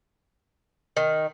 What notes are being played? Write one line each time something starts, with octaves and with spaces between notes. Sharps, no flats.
D#3